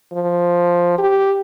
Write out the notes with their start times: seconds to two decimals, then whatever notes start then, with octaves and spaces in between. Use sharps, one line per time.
0.13 F3
0.98 G4